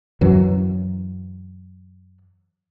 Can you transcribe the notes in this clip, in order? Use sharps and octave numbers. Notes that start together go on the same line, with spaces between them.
F#2 E3 F#3